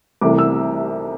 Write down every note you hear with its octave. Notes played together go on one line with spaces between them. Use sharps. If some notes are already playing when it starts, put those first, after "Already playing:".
C2 C3 E3 A3 D6
E6